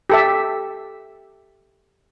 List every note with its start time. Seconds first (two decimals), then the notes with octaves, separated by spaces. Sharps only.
0.10 G4 A4 E5